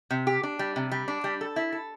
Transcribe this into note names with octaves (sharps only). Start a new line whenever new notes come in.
C3
G4
D4
G3
C3
G3
D4
G3
A4
E4
A4